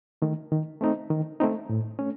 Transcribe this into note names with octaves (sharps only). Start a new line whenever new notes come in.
D#3 A3
D#3
A3 C4 D#4
D#3
A3 C4 D#4
A2
A3 C#4